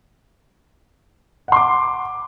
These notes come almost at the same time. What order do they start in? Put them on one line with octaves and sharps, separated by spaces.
F#5 C6 D6